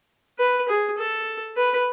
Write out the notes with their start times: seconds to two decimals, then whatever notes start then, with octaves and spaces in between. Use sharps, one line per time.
0.39 B4
0.69 G#4
0.98 A4
1.57 B4